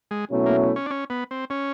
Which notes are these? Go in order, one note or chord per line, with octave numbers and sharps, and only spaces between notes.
G#3
B2 F#3 A3 C#4 E4
A#3
C#4
D4
C#4
B3
C4
C#4